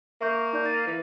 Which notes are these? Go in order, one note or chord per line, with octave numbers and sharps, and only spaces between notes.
A#3 E5 C#6 G6
D#4 D5 G6
A6 D#7
E3